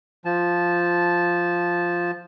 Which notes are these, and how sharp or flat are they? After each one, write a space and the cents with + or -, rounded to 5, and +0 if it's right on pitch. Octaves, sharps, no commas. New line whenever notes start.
F3 +0 A5 -15